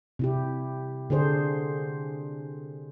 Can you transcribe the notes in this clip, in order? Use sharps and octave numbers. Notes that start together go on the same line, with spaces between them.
C3 E4 G4
D3 D4 G#4 C5